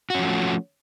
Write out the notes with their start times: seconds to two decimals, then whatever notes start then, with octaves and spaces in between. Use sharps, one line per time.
0.10 F#4
0.15 C#4
0.19 F3
0.24 A3